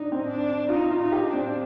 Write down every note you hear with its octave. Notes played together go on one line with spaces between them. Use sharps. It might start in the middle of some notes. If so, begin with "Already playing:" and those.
Already playing: D4 D#4
C4
D4
D#4 F4
F4
D#4
G4
D4
C4